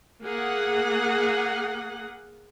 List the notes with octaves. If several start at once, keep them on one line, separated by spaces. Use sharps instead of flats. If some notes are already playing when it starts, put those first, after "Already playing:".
A#3 G#4 F#5